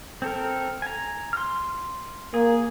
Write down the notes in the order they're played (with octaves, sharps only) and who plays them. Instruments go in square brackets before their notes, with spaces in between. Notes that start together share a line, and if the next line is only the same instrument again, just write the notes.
[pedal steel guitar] C4 A4 A#4
G#5 A#5
C6 F6
[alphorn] A#3 [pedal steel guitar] G#4